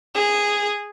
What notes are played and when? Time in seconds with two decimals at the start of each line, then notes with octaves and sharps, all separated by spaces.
0.15 G#4